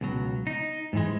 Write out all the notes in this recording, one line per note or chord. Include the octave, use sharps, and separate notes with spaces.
C#2 B2 F#3
D#4
G#2 E3 G#3